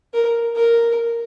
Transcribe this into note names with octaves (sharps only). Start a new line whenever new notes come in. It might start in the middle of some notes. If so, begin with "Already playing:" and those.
A#4
A#4